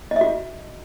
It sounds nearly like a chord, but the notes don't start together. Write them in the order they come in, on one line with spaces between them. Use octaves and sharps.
D#5 E5 F#4